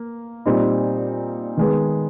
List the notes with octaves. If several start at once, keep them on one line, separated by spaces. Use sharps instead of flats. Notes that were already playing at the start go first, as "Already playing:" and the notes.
Already playing: A#3
A#2 G3 C4 D#4
D#3 G#3 B3